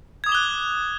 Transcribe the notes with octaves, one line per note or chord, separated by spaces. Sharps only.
D6 D#6 F#6 G#6 G7